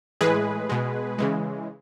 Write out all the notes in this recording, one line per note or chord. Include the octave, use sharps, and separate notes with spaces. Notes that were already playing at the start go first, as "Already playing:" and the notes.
A2 E3 G#3 G#4 B4
B2 G#3
C#3 E3 G#3